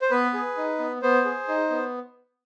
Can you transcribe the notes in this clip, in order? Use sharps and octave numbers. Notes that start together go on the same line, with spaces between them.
C5
B3 B4
G#4
D#4
B3
B3 C5
G#4
D#4
B3